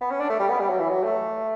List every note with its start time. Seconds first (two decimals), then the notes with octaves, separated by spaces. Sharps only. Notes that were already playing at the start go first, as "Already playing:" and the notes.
0.01 B3
0.11 C#4
0.20 D4
0.30 A3
0.40 G3
0.49 B3
0.60 G3
0.70 F#3
0.79 E3
0.89 F#3
1.04 A3